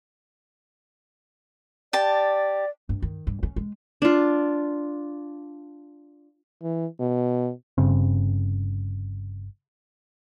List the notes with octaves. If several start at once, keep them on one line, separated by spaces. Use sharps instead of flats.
G4 D5 A5
G2
D#3
G2
C#4
G#3
D4 F4
E3
B2
G1 G2 C#3 C4